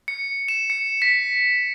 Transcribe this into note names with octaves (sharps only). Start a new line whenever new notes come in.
C#7
E7
C#7
B6